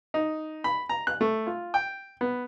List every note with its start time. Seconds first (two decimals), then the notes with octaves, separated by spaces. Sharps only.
0.14 D#4
0.64 B5
0.89 A#5
1.07 F#6
1.21 A3
1.47 F4
1.74 G5
2.21 B3